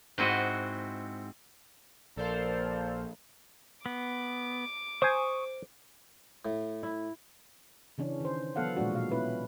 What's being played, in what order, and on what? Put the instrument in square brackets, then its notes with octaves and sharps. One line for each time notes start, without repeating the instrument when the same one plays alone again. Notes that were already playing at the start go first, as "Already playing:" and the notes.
[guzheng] G#2 C4 E4 F#4 D#5
[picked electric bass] A#1 [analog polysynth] A4 C5 F5 [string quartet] A#4 [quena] D5
[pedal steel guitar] B3 [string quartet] D6
[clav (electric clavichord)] C5 G#5 [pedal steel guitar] C#6 D#6
[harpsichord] A2
[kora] E4
[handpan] C#3 E3 C#4 D4
D#3 C5
E3 F#3 B3 A4 F5 F#5
A#2 F3 G#3 D4 F#4
B2 F5
B3 C#4 E4 B4